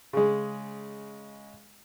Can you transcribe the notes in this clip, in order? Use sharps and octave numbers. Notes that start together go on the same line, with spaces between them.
C#3 G#3